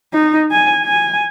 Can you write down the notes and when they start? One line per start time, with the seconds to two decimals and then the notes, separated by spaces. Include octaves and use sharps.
0.14 D#4
0.51 G#5
0.85 G#5